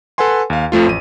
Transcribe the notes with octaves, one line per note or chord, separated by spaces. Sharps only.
A4 B4 F#5 G#5 C6
D#2 F5
F2 F3 A3 F4
A1 D#7